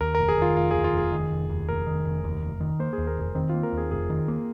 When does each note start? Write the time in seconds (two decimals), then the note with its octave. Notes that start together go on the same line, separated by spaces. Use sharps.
0.01 D#2 A#4
0.15 F1 A#4
0.28 G#4
0.38 D#3 F4
0.56 F1 F4
0.71 D#2 G#4
0.84 F4
0.93 F1 G#4
1.12 D#3
1.31 F1
1.49 D#2
1.69 F1 A#4
1.86 D#3
2.05 F1
2.24 D#2
2.42 F1
2.61 D#3
2.80 A#3 C5
2.93 G#4
2.98 D#2
3.07 A#4
3.17 F1 G#4
3.35 D#3 C4
3.49 A#3 F4
3.63 A#4
3.73 D#2
3.78 G#4
3.91 F1 G#4
4.10 D#3
4.28 A#3